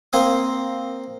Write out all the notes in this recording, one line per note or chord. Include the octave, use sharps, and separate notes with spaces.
A#3 C4 C5 D#6